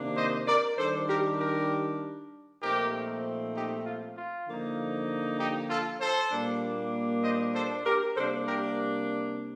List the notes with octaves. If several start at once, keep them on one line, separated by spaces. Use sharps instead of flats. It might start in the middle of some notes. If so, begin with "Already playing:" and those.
Already playing: C3 D#3 A#3 D4
C5 D#5
A#4 D5
D#3 G3 D4 A4 C5
G4 A#4
G4 A#4
A#2 F3 A3 C4 D#4 G4 A#4
D#4 G4
F4
F4
D3 F3 A#3 D#4
D#4 G4
F4 A4
A4 C5
A#2 G3 A#3 D4
C5 D#5
A4 C5
G4 A#4
C3 G3 A#3 D4 A4 C5
G4 A#4